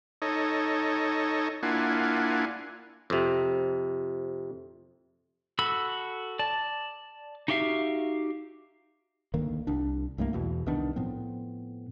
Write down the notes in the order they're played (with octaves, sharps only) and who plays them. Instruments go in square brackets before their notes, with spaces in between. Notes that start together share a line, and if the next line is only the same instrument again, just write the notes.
[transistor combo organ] D#4 A4 C#5 D#5
A#3 D4 E4 F4 F#5 G#5
[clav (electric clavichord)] F2 C3
[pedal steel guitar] F#4 A4 B5 E6
D5 A5
D#4 F#4 G4 E5 F5
[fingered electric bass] D2 D#3 A#3
C2 D4
C2 G2 A3 A#3
E2 B2 E3
C2 D#3 B3 D4
A2 F3 B3 C4